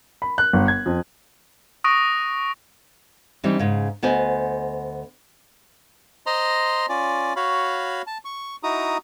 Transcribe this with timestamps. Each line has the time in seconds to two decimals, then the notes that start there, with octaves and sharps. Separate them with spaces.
0.22 B5
0.38 F#6
0.53 G1
0.68 G#6
0.86 F2
1.84 C#6 D#6 F#6 A#6 D7 D#7
3.44 E3 G3 C4 D4 D#4
3.59 G#2 C#3
4.03 D2 B3 C5 D#5 G#5
6.26 C5 D#5 A#5 C6
6.89 C#4 F4 D5
7.36 F#4 C#5 F5 B5
8.07 A5
8.25 C#6
8.63 D#4 E4 F#4 A#5 D#6